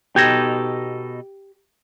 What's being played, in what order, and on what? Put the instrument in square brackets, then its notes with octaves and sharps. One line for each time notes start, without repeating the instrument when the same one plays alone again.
[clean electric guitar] B2 D#4 A4 [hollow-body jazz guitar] G4 [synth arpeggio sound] G6 G#6 A#6